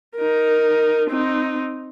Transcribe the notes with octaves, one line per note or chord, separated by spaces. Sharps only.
D#4 A#4
C4 D#4